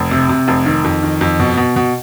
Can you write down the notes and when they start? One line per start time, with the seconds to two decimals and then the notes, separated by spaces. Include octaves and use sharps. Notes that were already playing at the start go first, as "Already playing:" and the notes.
Already playing: F1
0.11 C3
0.29 C3
0.48 F1
0.66 D#3
0.84 F2
1.03 D#3
1.21 F2
1.40 B2
1.57 B2
1.76 B2